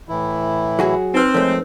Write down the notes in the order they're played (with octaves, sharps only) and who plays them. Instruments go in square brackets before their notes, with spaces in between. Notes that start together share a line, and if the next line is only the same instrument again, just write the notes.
[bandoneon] A2 E3 E4
[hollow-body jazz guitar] F#3 F#4 G#4
[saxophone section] C4 [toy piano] D#4 B4 C5
[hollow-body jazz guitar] F2 A3 [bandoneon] G#3 [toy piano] A#4 C#5